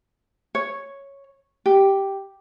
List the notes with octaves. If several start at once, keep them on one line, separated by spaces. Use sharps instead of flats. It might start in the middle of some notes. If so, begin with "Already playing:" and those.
C#5
G4